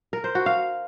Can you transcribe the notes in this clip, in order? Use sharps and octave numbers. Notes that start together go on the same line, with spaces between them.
A#4
C5
F#4
F5